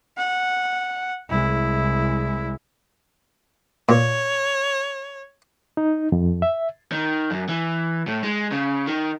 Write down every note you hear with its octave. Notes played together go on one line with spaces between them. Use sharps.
F#5
C2 G#3 E4
A#2 C#5
D#4
F2
E5
D#3
F#2
E3
A2
G#3
C#3
D#3